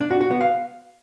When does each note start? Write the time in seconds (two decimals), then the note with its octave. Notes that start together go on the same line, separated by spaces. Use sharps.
0.01 D4
0.11 F#4
0.21 F#4
0.31 B3
0.41 F5